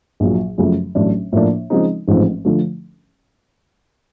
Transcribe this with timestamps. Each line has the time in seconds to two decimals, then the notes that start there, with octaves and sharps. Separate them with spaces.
0.20 A#1 A#2 F#3
0.58 F#2 C#3 F3 A3
0.95 A1 A2 F#3 A3 D4
1.32 A2 F3 A#3 D4
1.70 C#3 F3 G#3 C4 D#4
2.08 A1 G#2 F3 A3 C4
2.45 D3 F3 A3